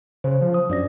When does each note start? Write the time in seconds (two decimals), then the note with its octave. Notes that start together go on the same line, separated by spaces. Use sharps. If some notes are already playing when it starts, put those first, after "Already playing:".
0.24 C#3 C5
0.41 F3
0.54 D#6
0.70 F#2 D4 D5 A#6